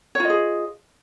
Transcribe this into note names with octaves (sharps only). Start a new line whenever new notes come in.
F4 G#4 C#5 D#5